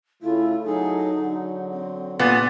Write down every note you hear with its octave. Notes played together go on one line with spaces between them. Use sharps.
C#3 A3 E4 F4
F#3 D#4 G#4 A4
D3 F#3
C4
A#2 G3 B3 D4